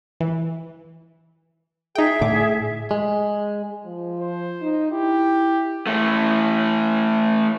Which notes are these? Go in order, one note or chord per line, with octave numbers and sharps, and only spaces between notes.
E3
D#4 G#4 E5 G5
A2 D3 D6
G#3
F3
C5
D#4
E4 G4
E3 A3